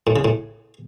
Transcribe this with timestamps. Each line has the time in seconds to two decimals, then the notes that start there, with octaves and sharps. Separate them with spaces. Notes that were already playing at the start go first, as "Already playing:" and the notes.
0.07 A2
0.16 C#3
0.25 A2